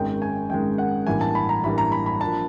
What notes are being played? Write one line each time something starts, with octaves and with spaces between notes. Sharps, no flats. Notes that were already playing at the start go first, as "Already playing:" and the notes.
Already playing: G#1 F#2 D#3 G#3 G5
G#5
G#1 F#2 D#3 G#3 G5
F#5
A1 G2 E3 G3 A#3 G#5
A5
B5
A#5
A1 G2 E3 G3 A#3 B5
A#5
B5
B5
F3 A#3 D4 A5